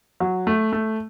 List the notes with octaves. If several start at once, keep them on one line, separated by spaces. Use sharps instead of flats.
F#3
A3
A3